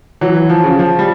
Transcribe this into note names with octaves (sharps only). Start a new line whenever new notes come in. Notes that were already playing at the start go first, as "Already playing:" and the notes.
E3 F#3
F3
C#3
F3
G3